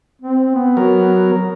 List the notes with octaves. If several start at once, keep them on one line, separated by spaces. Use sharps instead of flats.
C4
B3
F#3 A#4